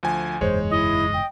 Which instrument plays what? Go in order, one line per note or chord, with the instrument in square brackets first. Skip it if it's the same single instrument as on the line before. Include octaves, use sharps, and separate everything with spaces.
[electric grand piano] D2 F3 G#5
[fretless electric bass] F#1 E2 G#2 [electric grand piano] G#3 C#5 [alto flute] C5
[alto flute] E4 [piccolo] D#5
[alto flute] G5